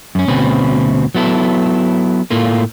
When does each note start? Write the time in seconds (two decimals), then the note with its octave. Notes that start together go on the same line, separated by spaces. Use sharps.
0.15 F#2 C#4
0.28 D2 B2 C4 C#4 B4
1.15 F#3 B3 E4 A4
2.31 A2 A3 A#3 F4